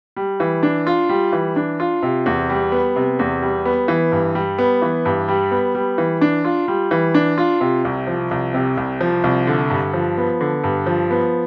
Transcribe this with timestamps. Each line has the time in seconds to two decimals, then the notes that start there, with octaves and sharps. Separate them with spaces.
0.17 G3
0.40 E3
0.63 D4
0.87 F4
1.09 G3
1.33 E3
1.56 D4
1.80 F4
2.03 C3
2.26 E2
2.50 G3
2.72 B3
2.96 C3
3.19 E2
3.42 G3
3.65 B3
3.88 E3
4.12 G2
4.35 G3
4.58 B3
4.82 E3
5.05 G2
5.28 G3
5.51 B3
5.75 G3
5.98 E3
6.21 D4
6.45 F4
6.68 G3
6.91 E3
7.14 D4
7.38 F4
7.61 C3
7.85 C2
8.07 F3
8.31 C2
8.54 C3
8.77 C2
9.01 F3
9.24 C2
9.47 D3
9.70 G2
9.94 F3
10.17 B3
10.41 D3
10.64 G2
10.86 F3
11.11 B3